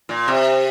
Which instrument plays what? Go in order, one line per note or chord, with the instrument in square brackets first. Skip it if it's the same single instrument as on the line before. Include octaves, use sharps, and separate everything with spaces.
[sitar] A#2
C3